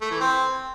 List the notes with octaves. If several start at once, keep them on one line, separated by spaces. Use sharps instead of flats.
A3
E3
C4